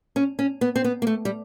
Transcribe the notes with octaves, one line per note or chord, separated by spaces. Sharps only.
C#4
C#4
B3
C4
B3
A#3
A3
G3